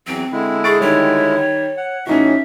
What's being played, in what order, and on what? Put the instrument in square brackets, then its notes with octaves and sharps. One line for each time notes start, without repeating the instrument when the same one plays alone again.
[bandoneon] E2 E3 F#3 [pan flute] C4
[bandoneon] D3 G#3 E4
[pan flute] G#4 [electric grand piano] C#6 A6 D7
[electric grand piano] D#3 G3 [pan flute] C#5
[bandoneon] F#5
[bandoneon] A2 E3 [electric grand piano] C#4 D#4 F#4 [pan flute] E5